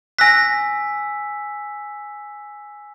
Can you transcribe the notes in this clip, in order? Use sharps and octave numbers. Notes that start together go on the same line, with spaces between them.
G#5 E6 F#6 A#6 B6